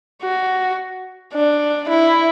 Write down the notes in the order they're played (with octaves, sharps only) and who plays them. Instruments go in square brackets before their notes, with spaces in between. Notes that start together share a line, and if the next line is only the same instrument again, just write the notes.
[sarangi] F#4
D4
E4